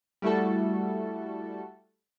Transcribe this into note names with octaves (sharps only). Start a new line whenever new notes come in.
G3 A3 E4 F#4 A4